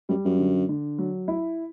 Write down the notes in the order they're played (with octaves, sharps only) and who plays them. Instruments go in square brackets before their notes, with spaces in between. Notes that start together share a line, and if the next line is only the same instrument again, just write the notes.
[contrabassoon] F#2 [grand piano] G3
[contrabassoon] F#2
[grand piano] D3
D3
F#3
E4